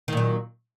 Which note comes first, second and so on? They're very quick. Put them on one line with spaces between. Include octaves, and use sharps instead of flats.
D#3 A#2 F#3